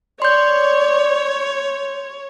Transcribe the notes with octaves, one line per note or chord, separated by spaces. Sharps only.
C#5 D5 C6 G6